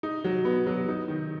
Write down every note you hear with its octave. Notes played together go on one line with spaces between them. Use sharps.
D#4
F#3
B3
F#3
D#4
D#3